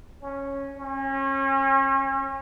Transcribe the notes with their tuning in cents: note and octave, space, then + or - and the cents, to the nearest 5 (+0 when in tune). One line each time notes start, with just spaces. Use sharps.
C#4 -5
C#4 -35